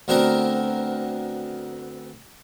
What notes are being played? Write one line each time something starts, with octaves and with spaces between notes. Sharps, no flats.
D2 B3 C4 D4 A#4